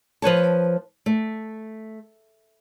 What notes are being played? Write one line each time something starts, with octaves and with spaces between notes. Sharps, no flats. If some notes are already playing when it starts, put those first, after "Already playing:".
F3 B4 C#5 A5
A3